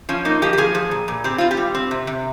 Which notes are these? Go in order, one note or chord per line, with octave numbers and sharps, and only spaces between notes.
F3 C#4
A#3 D#4
F3 G4
G4
F3 G#4
F3
A#2
A#2
C4 G4
C4 F4
G4
G3
C4
C3
C3